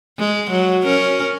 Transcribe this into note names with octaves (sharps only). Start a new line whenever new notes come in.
G#3
F#3
C#4 A#4